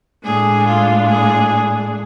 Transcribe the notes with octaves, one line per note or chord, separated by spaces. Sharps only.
A2 G#3 D4 G#4
F4
G#4